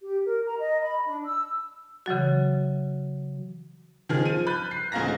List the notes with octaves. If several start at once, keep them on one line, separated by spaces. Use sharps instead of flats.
G4
A#4
A#5
D#5
B5
D4
E6
C#3 E3 F#3 F#4
D#3 F3 G#4 F6
F3 D#7
B5 F#6 G6 A6
C7
A1 D2 G#4 F5 A#5 A#6